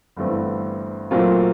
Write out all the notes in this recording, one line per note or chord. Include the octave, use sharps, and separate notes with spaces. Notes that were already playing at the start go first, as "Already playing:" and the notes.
G1 G2 E3 A3 C4
A#2 F#3 A3 C4 F4